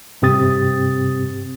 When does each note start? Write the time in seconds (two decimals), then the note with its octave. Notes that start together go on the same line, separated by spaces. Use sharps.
0.22 G2 C3 C4 G4 D#6 A6